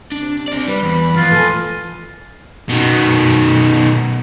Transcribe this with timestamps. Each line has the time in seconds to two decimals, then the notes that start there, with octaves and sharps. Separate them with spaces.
0.12 C3 D4
0.48 C4 D5
0.68 G3 B4
0.82 E2
1.16 E3 F3 F4
1.31 A2 A4 G#5
2.69 B2 D#3